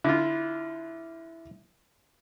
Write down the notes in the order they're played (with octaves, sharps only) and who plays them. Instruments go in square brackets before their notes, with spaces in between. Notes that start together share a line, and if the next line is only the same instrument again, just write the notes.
[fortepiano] D3 F4 [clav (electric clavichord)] E4